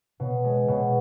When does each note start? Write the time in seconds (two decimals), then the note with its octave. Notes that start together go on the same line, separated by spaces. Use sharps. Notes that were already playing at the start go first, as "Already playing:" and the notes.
0.20 B2
0.44 G#3
0.68 B2